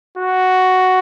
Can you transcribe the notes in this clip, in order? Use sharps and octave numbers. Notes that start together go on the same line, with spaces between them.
F#4